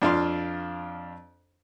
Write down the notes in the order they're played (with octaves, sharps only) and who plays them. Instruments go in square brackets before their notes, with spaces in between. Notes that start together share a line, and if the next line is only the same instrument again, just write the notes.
[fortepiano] F2 D4 F4 F5 C6